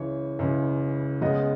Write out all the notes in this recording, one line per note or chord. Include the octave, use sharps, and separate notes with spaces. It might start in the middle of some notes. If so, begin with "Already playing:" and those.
Already playing: C#2 C#3 E3 C#5
C#2 C#3 E3
C#2 C#3 G#3 B3 D#5